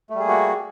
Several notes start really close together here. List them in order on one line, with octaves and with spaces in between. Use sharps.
A3 G3 G#4 A#3 F#4